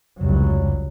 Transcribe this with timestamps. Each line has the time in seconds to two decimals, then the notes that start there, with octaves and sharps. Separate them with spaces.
0.21 F1 C#2 F#3 G3